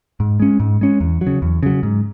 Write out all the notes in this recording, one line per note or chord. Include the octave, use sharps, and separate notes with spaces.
G#2
G#3 C#4
G#2
G#3 C#4
E2
F#3
C#3
E2
C#3 F#3
G#2